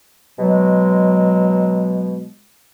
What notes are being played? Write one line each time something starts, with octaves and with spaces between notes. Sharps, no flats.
B2 F#3 G#3